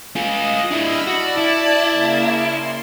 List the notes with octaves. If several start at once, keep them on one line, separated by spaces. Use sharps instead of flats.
F4 G#4 D#5
D4 E4 B5 E6 F6
F#4 D5 A5
E4
C#3 A#3
C6